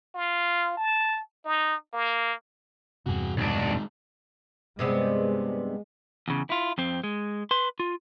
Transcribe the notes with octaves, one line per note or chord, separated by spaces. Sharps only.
F4
A5
D#4
A#3
E2 G2 C3 F#4 G#4
B1 D#3 G#3 D4
G2 C3 G#3 B3
E2 C#3
E4 F4
F2 C4
G#3
B4 C6
F4